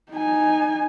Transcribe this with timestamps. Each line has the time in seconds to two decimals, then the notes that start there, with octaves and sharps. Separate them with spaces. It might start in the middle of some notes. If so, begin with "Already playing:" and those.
0.11 D#4 G#5